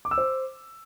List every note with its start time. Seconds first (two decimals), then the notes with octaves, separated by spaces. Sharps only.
0.05 D6
0.11 E6
0.18 C5